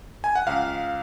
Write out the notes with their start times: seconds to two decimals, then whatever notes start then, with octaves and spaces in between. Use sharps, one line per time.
0.24 G#5
0.35 F#5
0.47 C#2 F5